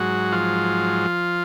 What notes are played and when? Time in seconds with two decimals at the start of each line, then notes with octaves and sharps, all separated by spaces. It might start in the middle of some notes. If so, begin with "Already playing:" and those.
Already playing: G#2 F#3 F#4
0.32 F3 F4